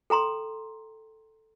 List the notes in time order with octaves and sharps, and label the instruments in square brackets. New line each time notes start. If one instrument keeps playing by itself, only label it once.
[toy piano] A4 G5 A#5 C6